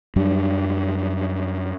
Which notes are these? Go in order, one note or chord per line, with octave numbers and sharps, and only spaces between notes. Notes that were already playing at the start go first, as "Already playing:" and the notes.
F#2 F#3 G3 D4